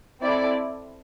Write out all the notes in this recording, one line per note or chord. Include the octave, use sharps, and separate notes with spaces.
C4 E4 A4 D5